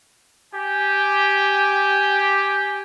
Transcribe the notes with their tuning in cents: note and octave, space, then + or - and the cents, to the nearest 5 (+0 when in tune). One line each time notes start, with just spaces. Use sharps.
G4 +0 G#5 +0